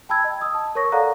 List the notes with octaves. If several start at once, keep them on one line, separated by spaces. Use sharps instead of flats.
G5 A5 B5 E6 G#6
D#5
D#6 E6
A5
A#4 C#5 C#6 A#6
A4 D5 F5 F#5 A#5 F#6